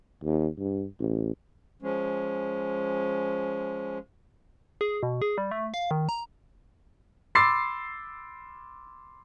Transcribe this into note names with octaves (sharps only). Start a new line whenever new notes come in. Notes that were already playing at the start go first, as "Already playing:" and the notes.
D#2
G2
A1
F3 G#3 C#4
G#4
B2
G#4
G3
A3
F5
D#3
A#5
B5 C6 D6 E6 A6 C7